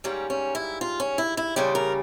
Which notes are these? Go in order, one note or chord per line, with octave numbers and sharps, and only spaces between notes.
G#2 G3 A#3 C#4
C#4
E4
F4
C#4
E4
E4
E2 C#3 G3 C5
A#4